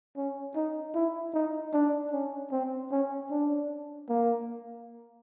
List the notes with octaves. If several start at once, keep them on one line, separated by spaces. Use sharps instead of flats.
C#4
D#4
E4
D#4
D4
C#4
C4
C#4
D4
A#3